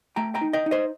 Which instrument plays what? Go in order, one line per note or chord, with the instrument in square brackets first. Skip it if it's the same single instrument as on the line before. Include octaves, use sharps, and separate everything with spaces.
[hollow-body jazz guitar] A3 G5 A#5
G5 A#5
D#4
D#5 G5
D#4
C5 D#5